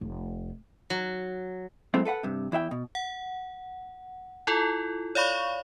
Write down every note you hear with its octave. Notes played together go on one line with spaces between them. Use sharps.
F1
F#3
F#3 G#3 A3 B3 C4 E4
A4 B4 F5 F#5
G2 C3
E2 E4 E5 G5
B2
F#5
E4 F4 A4
C#5 D5 F5 B5 C#6